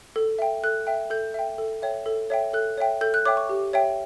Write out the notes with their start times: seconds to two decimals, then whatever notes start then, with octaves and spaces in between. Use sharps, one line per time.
0.16 A4
0.39 E5 G5
0.64 A4 F#6
0.87 E5 G5
1.10 A4 G6
1.34 E5 G5
1.58 A4
1.82 C#5 E5 G5
2.06 A4
2.30 C#5 E5 G5
2.53 A4 F#6
2.78 C#5 E5 G5
3.01 A4 G6
3.14 F#6
3.26 C#5 E5 G5 D6
3.37 C#6
3.49 G4
3.73 C#5 E5 G5